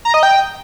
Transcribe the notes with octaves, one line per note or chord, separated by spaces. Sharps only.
A#5
D#5
G5